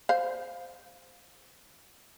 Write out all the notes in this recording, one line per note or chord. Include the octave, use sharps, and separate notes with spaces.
C5 F5